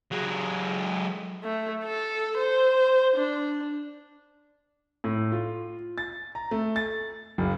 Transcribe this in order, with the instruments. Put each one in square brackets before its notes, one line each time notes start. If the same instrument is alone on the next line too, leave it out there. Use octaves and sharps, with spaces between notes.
[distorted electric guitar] F#3 G#3
[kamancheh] A3
A4
C5
D4
[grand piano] A2
F4
A6
A#5
A3
A6
F#1